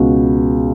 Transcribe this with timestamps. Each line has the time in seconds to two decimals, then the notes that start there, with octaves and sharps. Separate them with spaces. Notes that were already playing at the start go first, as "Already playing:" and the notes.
Already playing: C#2 B2 F#4